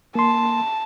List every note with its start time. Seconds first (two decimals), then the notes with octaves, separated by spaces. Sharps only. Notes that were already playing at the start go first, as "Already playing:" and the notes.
0.15 A#3 A5 C6